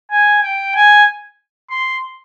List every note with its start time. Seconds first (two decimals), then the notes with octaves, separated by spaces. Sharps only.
0.11 G#5
0.43 G5
0.75 G#5
1.70 C6